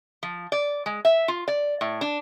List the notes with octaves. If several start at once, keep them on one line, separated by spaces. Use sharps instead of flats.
F3
D5
G#3
E5
F4
D5
A2
D4